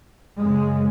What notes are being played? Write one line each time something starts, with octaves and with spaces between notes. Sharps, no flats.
F#2 C#3 G#3